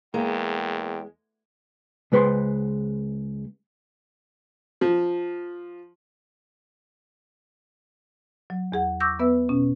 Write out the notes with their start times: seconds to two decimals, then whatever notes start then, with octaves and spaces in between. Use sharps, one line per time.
0.14 E2 G#3 A#3 G5
2.12 C#2 G#3 B4 C5 C6
4.81 F3
8.50 F#3
8.72 E2 G#4 F#5
9.00 C#6 D6 E6 G6 A#6
9.19 B3 B4 E5 E6
9.49 B2 C#4